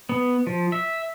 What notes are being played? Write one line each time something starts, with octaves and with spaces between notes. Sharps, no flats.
B3
F3
E5